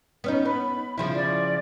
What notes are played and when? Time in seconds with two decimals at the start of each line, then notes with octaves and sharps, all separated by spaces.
0.24 B3 C#4 D#4
0.45 B3 B5
0.98 C#3 F3 E4
1.15 D5